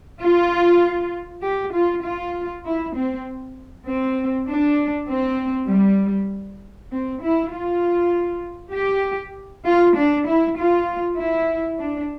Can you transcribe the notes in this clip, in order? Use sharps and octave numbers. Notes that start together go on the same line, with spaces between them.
F4
G4
F4
F4
E4
C4
C4
D4
C4
G3
C4
E4
F4
G4
F4
D4
E4
F4
E4
D4